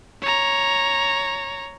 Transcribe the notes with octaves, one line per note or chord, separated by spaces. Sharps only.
C#5 A#5